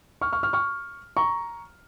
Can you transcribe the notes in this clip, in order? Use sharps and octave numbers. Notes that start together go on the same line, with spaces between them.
C#6 F6
C#6 F6
C#6 F6
C#6 F6
A#5 C#6